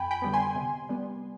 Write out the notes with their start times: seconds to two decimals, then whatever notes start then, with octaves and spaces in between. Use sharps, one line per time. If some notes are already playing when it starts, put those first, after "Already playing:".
Already playing: F2 G5 G#5 B5
0.11 G5 B5
0.22 D3 G3 B3
0.33 G#5 C6
0.56 C3
0.89 G3 B3